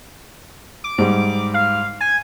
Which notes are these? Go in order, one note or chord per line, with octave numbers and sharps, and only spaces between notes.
D6
G#2 G3
F5
G#5